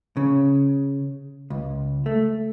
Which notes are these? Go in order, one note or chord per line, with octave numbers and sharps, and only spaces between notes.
C#3
C#2
A3